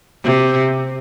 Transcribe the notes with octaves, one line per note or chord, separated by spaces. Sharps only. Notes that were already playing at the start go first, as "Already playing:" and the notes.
C3